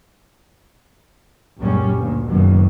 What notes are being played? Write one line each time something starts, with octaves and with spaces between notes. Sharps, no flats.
C#2 F#2 A#2 F#3 G3 C#4
D2 A#2
F#1 C#2 F#2 B2 D#3